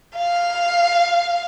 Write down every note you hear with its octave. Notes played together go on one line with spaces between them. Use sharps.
F5